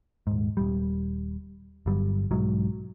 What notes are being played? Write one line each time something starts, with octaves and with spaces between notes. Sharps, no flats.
D#1 G#2
D#1 G3
G1 G2 F#3 G3
B1 G#2 F#3